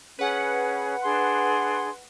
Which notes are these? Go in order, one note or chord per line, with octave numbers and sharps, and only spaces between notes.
C#4 G#4 B4 F#5
D4 G#4 C6